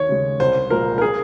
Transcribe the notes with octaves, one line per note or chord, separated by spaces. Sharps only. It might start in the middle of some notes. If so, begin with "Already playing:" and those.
Already playing: D#2 C#5
C#3 G#3
C2 C5
A#2 F3 G#3 A#4
A#4
G#4